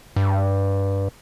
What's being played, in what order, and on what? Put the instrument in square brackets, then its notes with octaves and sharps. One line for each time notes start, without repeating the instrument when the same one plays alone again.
[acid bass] G2